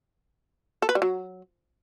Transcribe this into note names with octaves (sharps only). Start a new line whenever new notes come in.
A4
B4
G3
F#3